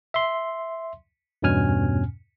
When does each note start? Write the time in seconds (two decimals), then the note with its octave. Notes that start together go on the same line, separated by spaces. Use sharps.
0.14 E5 C6
1.42 E2 G2 B2 C#4 G#5 F6